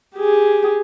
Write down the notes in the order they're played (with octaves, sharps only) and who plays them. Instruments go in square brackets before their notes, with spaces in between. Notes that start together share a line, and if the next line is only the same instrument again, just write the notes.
[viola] G4 G#4